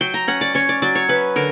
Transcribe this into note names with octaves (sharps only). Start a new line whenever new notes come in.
F#3 G5
A#5
C#4 F#5
D5
C#4 C#5
D5
F#3 D5
C#5
C#4 B4
D3 A#4